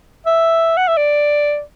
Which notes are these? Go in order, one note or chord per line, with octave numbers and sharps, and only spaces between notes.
E5
F#5
E5
D5